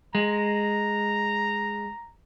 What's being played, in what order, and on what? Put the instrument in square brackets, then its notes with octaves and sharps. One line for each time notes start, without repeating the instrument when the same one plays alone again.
[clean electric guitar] G#3 [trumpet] A#5